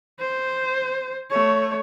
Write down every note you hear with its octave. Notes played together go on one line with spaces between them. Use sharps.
C5
A3 C#5